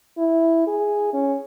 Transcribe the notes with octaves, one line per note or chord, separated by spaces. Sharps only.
E4
G#4
C#4